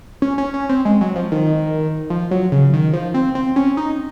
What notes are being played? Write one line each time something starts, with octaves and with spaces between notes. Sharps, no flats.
C#4
C#4
C#4
C4
G#3
F#3
F3
D#3
F3
F#3
C#3
D#3
F3
C4
C4
C#4
D#4